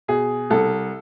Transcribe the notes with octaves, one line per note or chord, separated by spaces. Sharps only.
B2 G#4
C2 A4